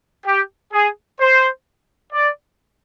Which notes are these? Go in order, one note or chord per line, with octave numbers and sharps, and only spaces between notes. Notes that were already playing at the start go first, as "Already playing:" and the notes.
G4
G#4
C5
D5